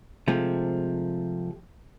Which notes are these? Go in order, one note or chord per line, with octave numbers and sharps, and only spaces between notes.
C3 F3 G#3 A3